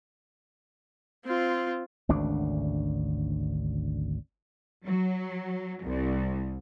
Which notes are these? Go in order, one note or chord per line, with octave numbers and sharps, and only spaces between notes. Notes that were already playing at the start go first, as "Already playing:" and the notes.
C4 F4
G#1 D2 C#3 D4
F#3
C2